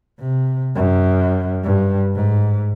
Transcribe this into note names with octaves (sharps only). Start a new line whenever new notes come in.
C3
F#2
G2
G#2